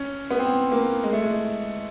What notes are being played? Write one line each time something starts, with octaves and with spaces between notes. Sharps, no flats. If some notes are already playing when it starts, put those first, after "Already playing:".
Already playing: C#4
B3
C4
A#3
G#3
A3
G#3